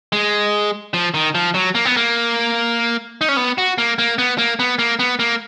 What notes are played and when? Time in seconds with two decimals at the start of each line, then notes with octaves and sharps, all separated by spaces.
0.13 G#3
0.94 F3
1.14 D#3
1.35 F3
1.54 F#3
1.75 A#3
1.85 B3
1.97 A#3
3.21 D#4
3.29 C#4
3.37 B3
3.58 F#4
3.78 A#3
3.99 A#3
4.18 B3
4.38 A#3
4.59 B3
4.79 A#3
4.99 B3
5.19 A#3